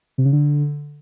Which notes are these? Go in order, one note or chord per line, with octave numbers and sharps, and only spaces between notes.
C3
C#3
D3